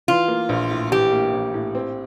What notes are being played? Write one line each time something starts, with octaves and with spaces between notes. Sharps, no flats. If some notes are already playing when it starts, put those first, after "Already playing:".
E3 F4
A#3
A#1
A2
E3 G4
A#3
A#1
A2
C4